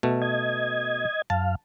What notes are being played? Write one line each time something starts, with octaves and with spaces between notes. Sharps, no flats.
B2 A3
D#5 G#6
F#2 F5 A5